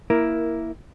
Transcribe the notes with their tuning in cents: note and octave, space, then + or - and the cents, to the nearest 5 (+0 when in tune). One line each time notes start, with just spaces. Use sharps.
A#3 +0 E4 -5 A#4 +10